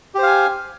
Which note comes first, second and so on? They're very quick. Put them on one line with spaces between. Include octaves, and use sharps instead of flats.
G4 C5 F5 G#5